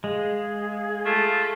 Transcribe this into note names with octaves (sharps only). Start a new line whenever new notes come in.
G#3 G#4 F5
A3 F4